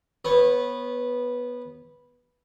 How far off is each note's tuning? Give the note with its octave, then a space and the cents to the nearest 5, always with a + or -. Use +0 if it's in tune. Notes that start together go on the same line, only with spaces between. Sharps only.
B3 -10 C#5 -35